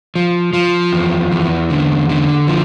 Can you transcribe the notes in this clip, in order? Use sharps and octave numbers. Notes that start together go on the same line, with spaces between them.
F3
F3
E2
E2
D3
D3
F3